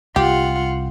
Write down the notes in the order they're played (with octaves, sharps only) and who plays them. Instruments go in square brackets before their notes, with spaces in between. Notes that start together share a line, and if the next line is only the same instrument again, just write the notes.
[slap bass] C2 [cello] F4 F#5 [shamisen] G4